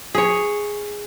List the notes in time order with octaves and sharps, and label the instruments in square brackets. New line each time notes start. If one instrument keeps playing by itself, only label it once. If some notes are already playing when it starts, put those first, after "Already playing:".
[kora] G#4 C#5